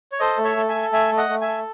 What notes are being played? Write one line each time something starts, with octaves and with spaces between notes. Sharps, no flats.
C#5
A4 C5 D#5
A3
C#5 E5
A4
E5 G#5
A4
A3 E5 G#5
A3
D#5 F#5
A3
E5 G#5
A4